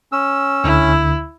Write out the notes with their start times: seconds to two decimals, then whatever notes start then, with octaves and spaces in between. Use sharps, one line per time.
0.12 C#4 E6
0.64 D2 D3 E4